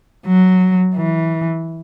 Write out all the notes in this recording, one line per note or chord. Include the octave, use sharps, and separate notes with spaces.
F#3
E3